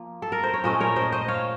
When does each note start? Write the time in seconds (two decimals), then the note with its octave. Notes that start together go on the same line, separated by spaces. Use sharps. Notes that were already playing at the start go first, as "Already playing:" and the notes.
Already playing: F3 A#3 F4
0.22 A4
0.32 A#4
0.43 C5
0.54 C#5
0.64 A#2 A3 C#4 C5 D#5
0.80 A#4 C#5
0.96 C5 D#5
1.12 C5 D#5
1.28 C#5 F5